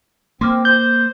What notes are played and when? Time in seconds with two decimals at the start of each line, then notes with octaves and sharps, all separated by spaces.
0.41 A#3 C4 C6 D6 F6
0.65 C5 G6